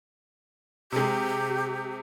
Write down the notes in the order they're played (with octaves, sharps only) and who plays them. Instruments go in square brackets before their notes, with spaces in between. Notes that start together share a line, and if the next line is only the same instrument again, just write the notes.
[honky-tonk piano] C3 G#3 [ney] G4